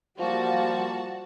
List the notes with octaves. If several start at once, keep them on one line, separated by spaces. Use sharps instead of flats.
F3 G3 A#3 F#4 A5